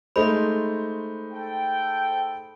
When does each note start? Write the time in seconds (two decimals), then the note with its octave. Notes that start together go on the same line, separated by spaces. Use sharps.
0.16 G#3 A3 D#4 C5 B5
1.32 A4 G5